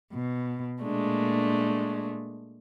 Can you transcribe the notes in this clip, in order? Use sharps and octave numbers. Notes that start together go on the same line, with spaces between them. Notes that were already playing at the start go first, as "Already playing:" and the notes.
B2
A#2 G#3 A3 D4